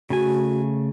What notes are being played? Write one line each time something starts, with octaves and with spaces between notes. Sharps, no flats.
C#3 A3 F#4 G#5